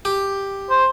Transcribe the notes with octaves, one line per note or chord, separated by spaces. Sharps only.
G4
C5